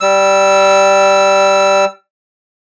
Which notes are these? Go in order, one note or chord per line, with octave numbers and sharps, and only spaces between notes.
G3 E6